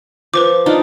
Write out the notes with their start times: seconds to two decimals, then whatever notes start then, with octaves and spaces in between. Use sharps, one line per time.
0.34 F3 B4 C5 D6
0.66 D4 D#4 F4